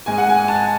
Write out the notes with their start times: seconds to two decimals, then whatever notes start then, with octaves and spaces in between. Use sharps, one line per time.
0.06 G#2 G#3 G#5
0.18 F#5
0.29 G#5
0.48 A5